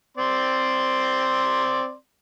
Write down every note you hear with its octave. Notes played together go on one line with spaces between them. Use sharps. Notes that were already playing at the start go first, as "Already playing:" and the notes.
C4 D5 C6